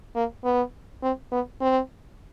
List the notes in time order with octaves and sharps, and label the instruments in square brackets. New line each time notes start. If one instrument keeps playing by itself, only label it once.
[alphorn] A#3
B3
C4
B3
C4